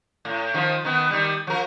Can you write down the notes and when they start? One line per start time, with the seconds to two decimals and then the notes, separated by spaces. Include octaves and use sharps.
0.25 A2
0.54 D#3 F3
0.84 D#3 B3
1.11 D#3 G3
1.47 F3 A#4